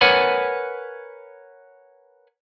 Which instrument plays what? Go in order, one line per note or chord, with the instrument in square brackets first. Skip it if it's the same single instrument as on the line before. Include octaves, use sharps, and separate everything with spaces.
[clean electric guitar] A#4 B4 C#5 F#5 G#5 B5